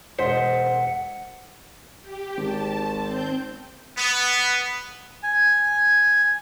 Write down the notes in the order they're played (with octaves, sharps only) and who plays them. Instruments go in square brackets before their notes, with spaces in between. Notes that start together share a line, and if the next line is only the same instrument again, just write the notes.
[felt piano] E1 D#5 B6 [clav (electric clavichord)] C5 [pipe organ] F#5
[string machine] G4
[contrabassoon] G#1 [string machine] A5
[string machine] C4 G6
[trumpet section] B3
[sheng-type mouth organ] G#5